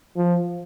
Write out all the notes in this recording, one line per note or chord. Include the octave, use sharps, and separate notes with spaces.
F3